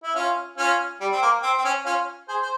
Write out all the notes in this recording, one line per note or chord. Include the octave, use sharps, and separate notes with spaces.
E4
C#4 F4
C#4 F4
G3
C4
A#3
C4
C4
C#4
C#4 F4
G#4 C5
C5